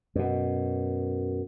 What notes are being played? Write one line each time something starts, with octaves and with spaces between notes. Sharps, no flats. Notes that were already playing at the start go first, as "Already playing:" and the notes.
F#2 B2